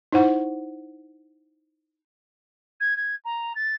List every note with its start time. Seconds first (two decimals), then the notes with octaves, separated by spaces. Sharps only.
0.12 D#4 E4 C5 F#5 C#6
2.80 G#6
2.97 G#6
3.25 A#5
3.55 A6